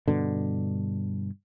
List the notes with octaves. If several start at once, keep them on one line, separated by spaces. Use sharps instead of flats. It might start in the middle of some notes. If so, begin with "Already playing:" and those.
G2 B2 D3